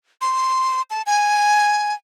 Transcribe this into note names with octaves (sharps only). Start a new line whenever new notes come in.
C6
A5
G#5